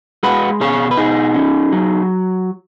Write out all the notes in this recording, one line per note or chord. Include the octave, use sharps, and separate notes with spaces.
G#3 F#4 B4
B2 G#4 C#5
B4
B2 D#4 G#4
C#4
F#3